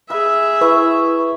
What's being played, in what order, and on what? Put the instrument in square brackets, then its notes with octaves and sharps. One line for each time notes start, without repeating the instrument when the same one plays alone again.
[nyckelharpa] G#4 E5 [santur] B4
[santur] E4 [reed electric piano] B4 [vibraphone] C#6